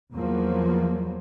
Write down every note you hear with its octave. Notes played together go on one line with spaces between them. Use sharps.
E2 F3 F#3 A#3 B3